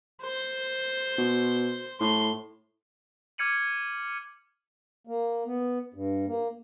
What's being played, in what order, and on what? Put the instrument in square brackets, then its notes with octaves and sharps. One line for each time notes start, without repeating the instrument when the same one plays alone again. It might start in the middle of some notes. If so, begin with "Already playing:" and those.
[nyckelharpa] C5
[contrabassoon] B2
[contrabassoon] A2 [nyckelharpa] C6
[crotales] D6 F6 G#6 C#7 D#7 F#7
[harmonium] A#3
B3
G2
A#3